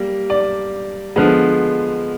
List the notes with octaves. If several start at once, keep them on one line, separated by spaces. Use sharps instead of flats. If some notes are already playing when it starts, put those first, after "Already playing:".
Already playing: G3 A#3
D5
D3 F3 G#3 B3